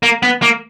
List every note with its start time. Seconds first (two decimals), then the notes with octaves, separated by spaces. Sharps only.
0.03 A#3
0.23 B3
0.42 A#3